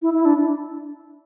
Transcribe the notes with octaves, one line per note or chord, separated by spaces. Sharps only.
E4
E4
D4